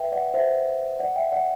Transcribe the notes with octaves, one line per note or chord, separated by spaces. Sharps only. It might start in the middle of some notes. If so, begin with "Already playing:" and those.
Already playing: B4 D5 E5 G5
D5 F#5
C5 E5
D5 F#5
E5 G5
D5 F#5